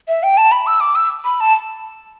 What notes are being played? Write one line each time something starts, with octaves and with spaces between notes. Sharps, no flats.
E5
G5
A5
B5
E6
D6
E6
B5
A5